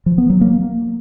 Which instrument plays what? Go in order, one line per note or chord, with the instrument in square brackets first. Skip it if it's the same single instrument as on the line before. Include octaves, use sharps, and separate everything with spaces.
[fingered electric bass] F3
B3
F#3
A#3